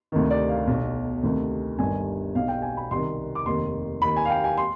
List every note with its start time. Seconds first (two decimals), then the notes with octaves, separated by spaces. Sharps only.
0.12 D2 C3 D#3
0.31 D5
0.49 F5
0.67 B1 B2
1.23 D2 C3 D#3
1.78 G1 G2 D#3 G#5
2.35 B1 B2 F5
2.48 G5
2.62 G#5
2.77 B5
2.91 C2 C3 D#3 C6
3.35 D6
3.46 F1 D#2 D#3 C6
4.02 D#2 D#3 B5
4.16 G#5
4.25 F5
4.30 G5
4.44 G#5
4.58 C6